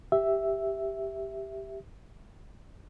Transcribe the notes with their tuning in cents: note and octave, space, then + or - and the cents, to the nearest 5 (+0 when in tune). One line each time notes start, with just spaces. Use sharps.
G4 +0 E5 +0